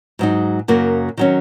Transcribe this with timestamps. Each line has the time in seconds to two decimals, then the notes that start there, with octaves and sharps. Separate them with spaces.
0.19 G#2 F#3 D#4
0.68 F#2 C#3 F#3 A#3
1.17 D#3 F#3 C#4